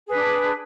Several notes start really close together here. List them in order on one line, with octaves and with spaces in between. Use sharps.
G#4 B4 D4